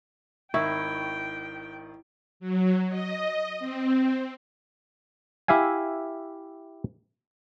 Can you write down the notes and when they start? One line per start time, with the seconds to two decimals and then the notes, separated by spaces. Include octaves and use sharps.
0.54 G#1 D#3 E4 G5 C#6
2.40 F#3
2.88 D#5
3.59 C4
5.48 E4 G4 E5 F5 G#5